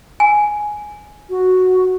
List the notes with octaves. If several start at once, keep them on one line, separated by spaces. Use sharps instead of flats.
G#5
F#4